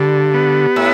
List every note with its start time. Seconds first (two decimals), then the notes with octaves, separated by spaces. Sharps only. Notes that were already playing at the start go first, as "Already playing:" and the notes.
Already playing: G2 D3
0.34 B3
0.76 A2 E5